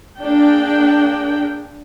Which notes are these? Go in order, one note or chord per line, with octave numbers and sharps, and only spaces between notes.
A#3 D4 G#4 G5